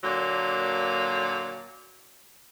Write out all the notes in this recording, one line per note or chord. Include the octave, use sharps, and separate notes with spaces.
A#2 D3 F#3 A#3